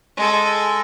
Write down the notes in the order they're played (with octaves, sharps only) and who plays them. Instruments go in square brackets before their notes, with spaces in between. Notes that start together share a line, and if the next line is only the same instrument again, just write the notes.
[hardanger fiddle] G#3 A4